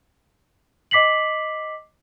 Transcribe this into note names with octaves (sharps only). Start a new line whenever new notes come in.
D#5 D6 B6 C7 F#7